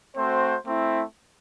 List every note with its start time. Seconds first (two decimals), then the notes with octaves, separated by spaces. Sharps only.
0.15 A3 C4 F#4 C5
0.65 A3 C4 E4